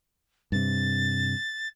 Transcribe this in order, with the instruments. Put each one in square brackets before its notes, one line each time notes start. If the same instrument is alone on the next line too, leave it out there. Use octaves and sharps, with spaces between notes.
[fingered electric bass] G2 C3 [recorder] A6